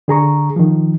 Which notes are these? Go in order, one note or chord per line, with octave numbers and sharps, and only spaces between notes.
D3 G#4 A#5 C#6
D#3 F3